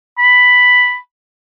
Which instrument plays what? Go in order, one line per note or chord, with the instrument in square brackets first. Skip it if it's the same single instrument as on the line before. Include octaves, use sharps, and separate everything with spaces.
[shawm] B5